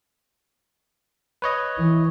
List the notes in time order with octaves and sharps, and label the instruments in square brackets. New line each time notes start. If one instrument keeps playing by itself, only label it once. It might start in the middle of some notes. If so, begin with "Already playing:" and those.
[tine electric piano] B4 C#5 D#5
[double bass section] E3